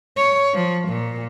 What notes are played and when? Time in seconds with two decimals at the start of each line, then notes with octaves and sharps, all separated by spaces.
0.17 C#5
0.54 F3
0.89 A#2